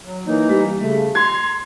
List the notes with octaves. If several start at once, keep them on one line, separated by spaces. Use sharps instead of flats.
F#3
E3 A#3 D#4
G3
C#3 A3
A#5 C6 G#6